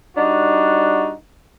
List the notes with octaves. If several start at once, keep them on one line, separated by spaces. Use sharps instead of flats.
G3 D4 D#4 F#4